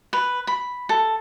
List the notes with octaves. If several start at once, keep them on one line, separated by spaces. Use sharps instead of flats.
B4
B5
A4